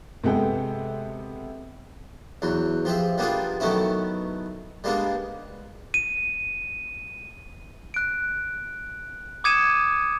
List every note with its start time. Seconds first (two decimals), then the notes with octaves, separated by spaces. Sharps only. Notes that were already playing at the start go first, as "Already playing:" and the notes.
0.23 C3 G#3 B3 A4 G5
2.42 E2 F#3
2.85 F3 G4 G#4 E5
3.18 G3 A#3 B3 D4 F4 G#4
3.60 D#3 F#3 A3 B3 C#4 E4
4.84 G3 G#3 A#3 B3 D4
5.94 D#7
7.94 F#6 D7
9.44 D6 D#6 G#6 C#7 D#7 E7